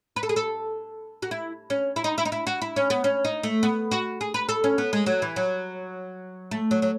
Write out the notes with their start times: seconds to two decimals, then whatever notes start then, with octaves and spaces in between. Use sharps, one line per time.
0.16 B4
0.23 A4
0.29 G#4
0.36 A4
1.22 F#4
1.31 E4
1.70 C#4
1.96 E4
2.04 D#4
2.18 E4
2.25 D#4
2.32 E4
2.47 F#4
2.62 E4
2.76 C#4
2.90 B3
3.04 C#4
3.25 D#4
3.43 A3
3.63 B3
3.91 F#4
4.21 G#4
4.34 B4
4.49 A4
4.64 C#4
4.78 B3
4.93 G#3
5.06 F#3
5.22 E3
5.36 F#3
6.51 A3
6.71 F#3
6.82 F#3